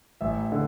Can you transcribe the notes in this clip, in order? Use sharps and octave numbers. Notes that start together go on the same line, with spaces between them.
A1 E5
D3